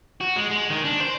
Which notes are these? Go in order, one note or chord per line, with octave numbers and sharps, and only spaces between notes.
F#4
G#3
G#3
D#3
D4
C5